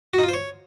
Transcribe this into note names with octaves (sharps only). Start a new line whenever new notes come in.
F#4
D#4
F4
C5
C#5